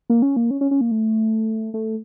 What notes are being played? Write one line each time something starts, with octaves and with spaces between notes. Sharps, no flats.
A#3
C#4
A#3
C#4
C#4
C#4
A#3
A3
A3